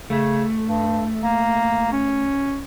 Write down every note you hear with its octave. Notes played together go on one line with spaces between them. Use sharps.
C#3 A3
G2
A#3
C#4